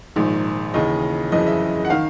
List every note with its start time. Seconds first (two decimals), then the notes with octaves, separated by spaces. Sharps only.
0.16 A#1 G#2 D#3
0.74 D#2 C#3 E3 D#5
1.32 F#1 F2 C#3 E3 D#5
1.47 E5
1.85 F#5
1.90 D#3 F5